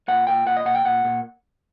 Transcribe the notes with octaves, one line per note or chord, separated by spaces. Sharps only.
A#2 F#5
A#2 G5
A#2 F#5
D#5
A#2 F#5
G5
A#2 F#5
A#2